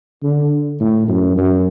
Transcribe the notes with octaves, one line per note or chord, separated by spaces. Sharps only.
D3
A2
F#2
F#2